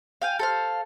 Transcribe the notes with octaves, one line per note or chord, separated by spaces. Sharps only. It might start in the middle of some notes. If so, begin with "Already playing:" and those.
F5 G5 G#5
A4 C5 F5